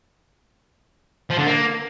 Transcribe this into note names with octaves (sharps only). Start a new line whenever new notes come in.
F3
D3
A#3